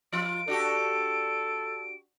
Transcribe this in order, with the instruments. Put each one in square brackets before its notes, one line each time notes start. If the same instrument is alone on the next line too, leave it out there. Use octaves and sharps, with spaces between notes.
[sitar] F3 F4 [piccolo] D7
[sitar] D4 F#4 G4 [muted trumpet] A4